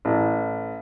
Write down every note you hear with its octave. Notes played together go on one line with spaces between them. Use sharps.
A1